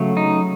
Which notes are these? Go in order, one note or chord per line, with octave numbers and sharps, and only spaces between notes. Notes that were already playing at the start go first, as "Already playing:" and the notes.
Already playing: C#3 F#3 A3
D#4